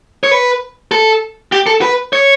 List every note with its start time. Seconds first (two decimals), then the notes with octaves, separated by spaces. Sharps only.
0.24 C#5
0.31 B4
0.92 A4
1.52 G4
1.67 A4
1.82 B4
2.13 C#5